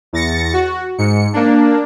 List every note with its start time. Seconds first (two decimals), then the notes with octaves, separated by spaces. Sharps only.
0.13 E2 A6 A#6 C#7
0.53 F#4
0.98 G#2 C#7
1.33 A#3 D4